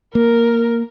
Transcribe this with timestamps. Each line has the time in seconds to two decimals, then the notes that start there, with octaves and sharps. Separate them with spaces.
0.15 A#3 A#4